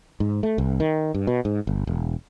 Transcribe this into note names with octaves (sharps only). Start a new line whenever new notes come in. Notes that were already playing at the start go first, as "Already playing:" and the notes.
G#2
A3
C2
D#3
G2
B2
G#2
G1
E1